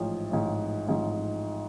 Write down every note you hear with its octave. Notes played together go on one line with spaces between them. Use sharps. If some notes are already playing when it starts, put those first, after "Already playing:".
Already playing: A1 G#2 F3
A1 G#2 F3
A1 G#2 F3